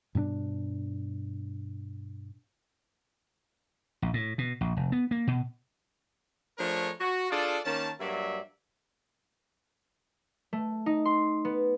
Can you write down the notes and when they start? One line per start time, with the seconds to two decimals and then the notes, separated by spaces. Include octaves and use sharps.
0.15 G2 B2 C4 D4
4.02 A#1
4.14 A2
4.38 B2
4.61 A#1
4.77 F1
4.92 B3
5.11 A#3
5.27 B2
6.59 F3 A3 D4 G#4 A#4 C#5
6.99 F#4
7.30 D4 F4 G#4 A4 D5
7.65 D#3 A#3 C#4 A5
7.99 G2 F#3 A#3 D5 E5
10.53 A3
10.86 D#4
11.05 C6
11.45 B3